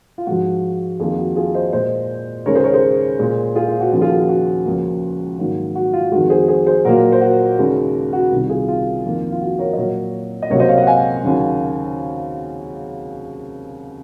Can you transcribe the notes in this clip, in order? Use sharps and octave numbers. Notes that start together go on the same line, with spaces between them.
F4
G#2 F3 G#3 F#4
F2 D#3 A#3 F4 G#4
F#4
F4 G#4
C5 D#5
A#2 G#3 C5 D#5
D#2 C#3 G#3 A#4 C#5
G#4 C5
A#4 C#5
G#4 C5
A#2 G#3
F4 G#4
F4
F#4
D#2 C#3 F3 A#3 F#4
F4 G#4
F#4
F4
F#4
C#2 C#3 F3 A#3
G#2 D#3 F#3 A#3
F#4
F4
F2 D#3 G#3 F#4
G#4 C5
G#4 C5
G#4 C5
A#2 F#3 A#3 F#4 A#4
C5
F#4 A#4
D#2 C#3 G#3
F#4
C2 C3 D#3
F4 G#4
F4
F2 D#3 A#3
F4
F#4
A#4 C#5
D#5
A#2 F#3 A#3 A#4 C#5
D#5
C#2 C3 F#3 A#3 A#4 C#5
C5 D#5
C#5 F5
D#5 F#5
F5 G#5
D#2 C#3 F#3